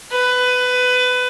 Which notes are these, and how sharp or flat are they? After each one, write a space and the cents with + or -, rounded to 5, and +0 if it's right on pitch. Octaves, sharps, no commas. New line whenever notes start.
B4 +20